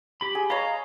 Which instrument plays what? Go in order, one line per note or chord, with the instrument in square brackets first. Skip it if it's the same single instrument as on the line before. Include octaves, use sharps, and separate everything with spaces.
[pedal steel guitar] G4 B5
[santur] G#4
[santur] C#5 B5 [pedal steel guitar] D#5 F5 A#5